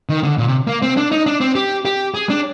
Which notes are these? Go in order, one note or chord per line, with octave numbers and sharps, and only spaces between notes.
D#3
D3
A#2
C3
A#3
C4
D4
D#4
D4
C4
G4
G4
G#4
D4